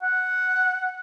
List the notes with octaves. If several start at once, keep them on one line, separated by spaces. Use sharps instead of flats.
F#5